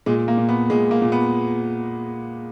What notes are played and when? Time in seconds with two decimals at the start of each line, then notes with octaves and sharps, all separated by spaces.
0.06 A#2 G#3
0.28 A#3
0.38 A#2
0.49 B3
0.70 A#2 G#3
0.91 A#3
1.02 A#2
1.12 B3